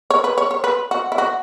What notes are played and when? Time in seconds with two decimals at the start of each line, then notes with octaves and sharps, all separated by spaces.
0.10 C#5
0.24 B4
0.38 C#5
0.51 C#5
0.64 B4
0.91 F#4
1.12 E4
1.18 F#4